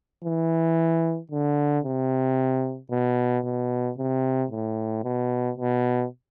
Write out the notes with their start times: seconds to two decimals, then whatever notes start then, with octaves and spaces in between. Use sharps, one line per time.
0.24 E3
1.31 D3
1.84 C3
2.91 B2
3.44 B2
3.98 C3
4.51 A2
5.04 B2
5.58 B2